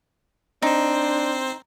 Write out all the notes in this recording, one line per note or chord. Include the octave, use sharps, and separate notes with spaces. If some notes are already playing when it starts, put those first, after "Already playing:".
C4 D4 D#4 C5